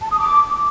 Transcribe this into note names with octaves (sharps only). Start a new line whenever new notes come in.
A5
D#6
D6